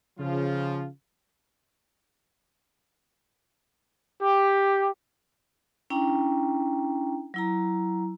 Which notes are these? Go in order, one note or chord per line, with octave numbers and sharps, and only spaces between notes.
C#3 F3 F4
G4
C#4 D4 E4 G5 A#5
F#3 E4 A#5